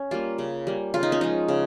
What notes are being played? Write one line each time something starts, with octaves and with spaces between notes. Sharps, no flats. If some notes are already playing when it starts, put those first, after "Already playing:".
Already playing: C#4
G3 A#3 F4
C#3
G3 A#3
C#3 F4
D#4
C#4
F3 G#3 D#4
C#3